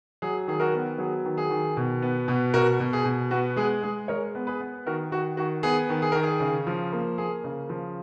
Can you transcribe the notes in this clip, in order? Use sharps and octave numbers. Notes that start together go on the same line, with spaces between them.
F#3 G#4
D#3 G#4
F#4 A#4
B3
F#3 G#4
D#3
G#4
D#3
B2
B3
B2
B2 F#4 A#4
B2
G#4
B2
B3 F#4
G#3 G#4
G#3 G#4
G#3 A#4 C#5
B3
G#4 B4
B3
D#3 F#4 A#4
D#3 F#4
D#3 F#4
B3 G#4
D#3
G#4
D#3 A#4
G#4
C#3
F3
A#3
A#3 G#4
C#3
F3